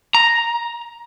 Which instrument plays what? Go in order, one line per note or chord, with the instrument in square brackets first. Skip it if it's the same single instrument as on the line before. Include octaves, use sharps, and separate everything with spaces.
[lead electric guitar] A#5